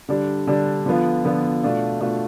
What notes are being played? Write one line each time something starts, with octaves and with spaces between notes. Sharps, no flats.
D3 G3 D4
D3 G3 D4
D3 F3 B3 F4
D3 F3 B3 F4
B2 A3 D4 F4
B2 A3 D4 F4